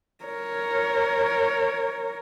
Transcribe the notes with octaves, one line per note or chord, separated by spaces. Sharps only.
A#4 C#5